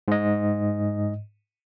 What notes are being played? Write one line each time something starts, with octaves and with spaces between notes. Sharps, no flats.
G#2 D#5